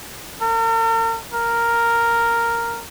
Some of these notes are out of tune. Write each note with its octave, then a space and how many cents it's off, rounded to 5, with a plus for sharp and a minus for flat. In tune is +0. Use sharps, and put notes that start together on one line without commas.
A#4 -45
A#4 -5